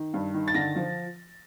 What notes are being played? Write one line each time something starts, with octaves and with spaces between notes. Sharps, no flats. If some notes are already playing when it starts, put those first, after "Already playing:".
Already playing: D#3
G2
D#3
A6
D3 A#6
F3